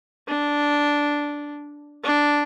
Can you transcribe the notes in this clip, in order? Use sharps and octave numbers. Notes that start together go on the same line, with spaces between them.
D4
D4